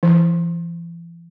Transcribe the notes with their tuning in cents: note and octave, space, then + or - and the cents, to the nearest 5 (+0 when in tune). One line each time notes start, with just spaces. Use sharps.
E3 +40